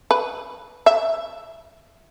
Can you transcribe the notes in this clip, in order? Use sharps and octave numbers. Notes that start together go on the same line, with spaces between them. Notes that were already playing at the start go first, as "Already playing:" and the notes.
B4
E5